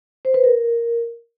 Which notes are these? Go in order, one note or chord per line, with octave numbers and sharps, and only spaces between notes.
C5
B4
A#4